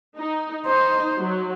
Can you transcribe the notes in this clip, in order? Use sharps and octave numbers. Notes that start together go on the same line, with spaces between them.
D#4
D#4 C5
F#3